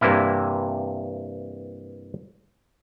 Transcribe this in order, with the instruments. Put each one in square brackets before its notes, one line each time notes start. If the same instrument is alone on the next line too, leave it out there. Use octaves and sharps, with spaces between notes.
[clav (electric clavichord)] G2 C3 E3 A#3 E4